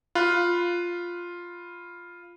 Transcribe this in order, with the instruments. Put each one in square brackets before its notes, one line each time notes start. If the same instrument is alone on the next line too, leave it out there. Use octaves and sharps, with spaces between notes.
[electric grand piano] F4 B5 F#6